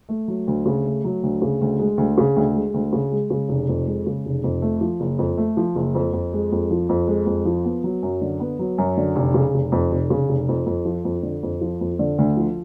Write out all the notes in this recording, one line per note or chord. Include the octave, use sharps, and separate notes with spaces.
A3
F#3
D2
C#3
A3
F#3
D2
C#3
D2
G#3
D2
C#3
D2
G#3
D2
C#3
G#3
C#3
F1
F2
G#3
C#3
F1
F2
A3
F3
F#1
F2
A3
F3
F#1
F2
F2
G#3
F2
F3
F2
G#3
F2
F3
B3
F#3
F#2
D3
B3
F#3
F#2
D3
F1
C#3
F1
F2
F1
C#3
F1
F2
F2
F3
F2
D3
F2
F3
F2
D3
D2
F3